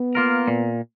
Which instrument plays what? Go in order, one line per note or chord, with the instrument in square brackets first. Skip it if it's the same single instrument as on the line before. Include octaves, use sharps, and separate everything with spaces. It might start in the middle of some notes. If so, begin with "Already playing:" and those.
Already playing: [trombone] B3
[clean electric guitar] A#3 F4 A#4
A#2